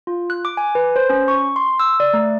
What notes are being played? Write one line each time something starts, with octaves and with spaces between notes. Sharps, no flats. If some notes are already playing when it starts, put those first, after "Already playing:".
F4
F#6
D6
G#5
B4
C5
C#4
C#6
C6
E6
D5
A3